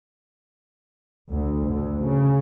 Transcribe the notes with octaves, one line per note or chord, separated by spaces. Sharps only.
D2
D2
C#3